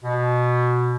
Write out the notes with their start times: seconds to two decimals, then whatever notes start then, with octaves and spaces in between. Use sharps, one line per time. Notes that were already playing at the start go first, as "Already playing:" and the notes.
0.04 B2